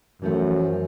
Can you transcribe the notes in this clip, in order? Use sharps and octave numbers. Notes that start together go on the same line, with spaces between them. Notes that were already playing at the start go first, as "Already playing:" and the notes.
F#2 E3 F3 A3